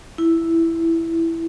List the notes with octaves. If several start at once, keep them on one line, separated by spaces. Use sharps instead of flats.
E4